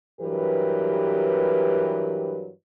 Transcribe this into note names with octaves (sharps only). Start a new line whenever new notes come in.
G2 E3 F#3 G4 A#4 B4